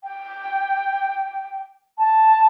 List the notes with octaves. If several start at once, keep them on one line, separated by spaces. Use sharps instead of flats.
G5
A5